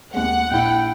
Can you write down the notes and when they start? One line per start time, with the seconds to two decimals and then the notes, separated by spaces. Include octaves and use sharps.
0.14 D#2 G#3 F#5
0.51 A#1 E4 G5